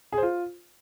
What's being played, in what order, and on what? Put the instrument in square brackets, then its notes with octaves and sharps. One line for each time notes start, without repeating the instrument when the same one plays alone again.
[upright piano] G#4
C5
F4